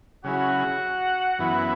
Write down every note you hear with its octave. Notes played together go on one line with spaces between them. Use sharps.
C#3 F#3 C#4 E4 F#4 G#4 F#5
F#2 E3 B3 E4